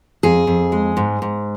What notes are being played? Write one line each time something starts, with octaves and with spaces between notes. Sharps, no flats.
F2 G#4
F2
G#3
G#2
G#2